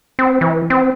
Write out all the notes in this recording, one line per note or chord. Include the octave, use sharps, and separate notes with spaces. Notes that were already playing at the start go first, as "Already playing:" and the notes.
C4
E3
C4